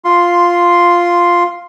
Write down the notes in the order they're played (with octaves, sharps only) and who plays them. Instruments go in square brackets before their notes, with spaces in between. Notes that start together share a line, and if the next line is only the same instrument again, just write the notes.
[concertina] F4 C6